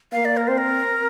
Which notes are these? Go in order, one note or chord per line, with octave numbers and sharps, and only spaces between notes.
A#3 F5
D5
A#4
C4 C5
A#4